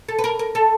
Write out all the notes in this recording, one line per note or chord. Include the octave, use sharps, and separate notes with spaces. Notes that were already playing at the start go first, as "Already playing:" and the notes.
A4
B4
A#4
A#4
A4